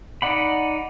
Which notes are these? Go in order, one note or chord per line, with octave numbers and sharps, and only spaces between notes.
D#4 D5 F#5 B5